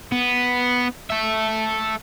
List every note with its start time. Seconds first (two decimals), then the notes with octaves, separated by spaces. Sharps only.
0.12 B3
1.10 A4 E5